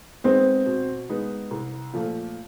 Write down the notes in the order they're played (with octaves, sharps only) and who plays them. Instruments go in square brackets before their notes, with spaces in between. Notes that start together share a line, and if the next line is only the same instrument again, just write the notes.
[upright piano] G#3 B3 D#4 [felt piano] C4
[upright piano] B2
G#3 B3 D#4
C2
A#2 F3 A3